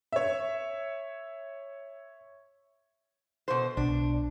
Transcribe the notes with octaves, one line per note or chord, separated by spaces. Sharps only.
C#5 E5
B2 C5
B1 D4